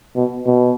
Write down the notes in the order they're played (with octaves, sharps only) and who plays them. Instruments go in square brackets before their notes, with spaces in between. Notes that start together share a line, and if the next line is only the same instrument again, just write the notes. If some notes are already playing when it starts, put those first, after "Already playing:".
[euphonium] B2
B2